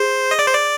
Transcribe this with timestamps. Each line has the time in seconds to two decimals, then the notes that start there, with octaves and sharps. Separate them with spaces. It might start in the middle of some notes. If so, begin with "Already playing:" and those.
Already playing: G#4 C5
0.31 D#5
0.39 D5
0.46 C5
0.54 D5